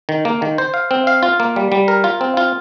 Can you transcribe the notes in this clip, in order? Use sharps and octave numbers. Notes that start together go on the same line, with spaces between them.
D#3
A#3
D#3
C5
F5
C4
F5
F4
A#3
G3
G3
A#4
F4
C4
F4